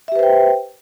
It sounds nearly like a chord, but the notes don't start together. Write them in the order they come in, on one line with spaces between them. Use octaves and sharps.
E5 G4 B4 C5 G5